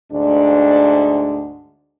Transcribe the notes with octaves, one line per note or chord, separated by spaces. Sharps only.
D2 G#2 D4